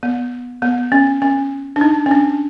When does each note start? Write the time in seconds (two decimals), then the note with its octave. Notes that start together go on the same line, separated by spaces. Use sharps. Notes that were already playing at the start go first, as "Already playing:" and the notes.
0.03 B3
0.62 B3
0.92 C#4
1.22 C#4
1.76 D4
1.81 D#4
2.06 C#4
2.11 D4